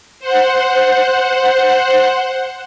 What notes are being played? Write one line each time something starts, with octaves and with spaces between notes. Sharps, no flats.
C5 F#5